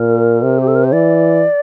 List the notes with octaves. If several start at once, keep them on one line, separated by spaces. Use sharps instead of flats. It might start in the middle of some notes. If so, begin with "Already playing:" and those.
Already playing: A#2 A#4
C3
G4
A4
A#4
C5
E3 D5